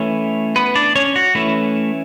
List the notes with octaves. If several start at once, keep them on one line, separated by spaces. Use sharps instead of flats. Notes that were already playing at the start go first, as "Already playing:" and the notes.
Already playing: E3 A3 C#4
B3 B4
D4 D5
C#4 C#5
F#4
E3 A3 C#4 E4